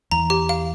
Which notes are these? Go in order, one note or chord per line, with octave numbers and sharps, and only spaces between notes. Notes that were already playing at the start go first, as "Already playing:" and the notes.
E2 A#5
G4
F5